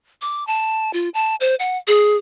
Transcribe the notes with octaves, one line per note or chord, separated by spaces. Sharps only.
D6
A5
F4
A5
C5
F#5
G#4